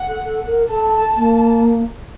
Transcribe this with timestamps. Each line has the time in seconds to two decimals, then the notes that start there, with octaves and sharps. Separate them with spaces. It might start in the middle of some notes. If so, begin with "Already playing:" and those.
Already playing: F#5
0.08 A4
0.24 A4
0.47 A#4
0.70 A4 A5
1.16 A#3